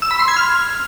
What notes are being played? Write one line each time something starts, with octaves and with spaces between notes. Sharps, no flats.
E6
B5
C6
G#6
F6